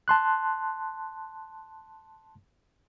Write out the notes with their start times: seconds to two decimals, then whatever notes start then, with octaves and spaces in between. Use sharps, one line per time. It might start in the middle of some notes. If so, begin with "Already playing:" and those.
0.08 A5 C6 F#6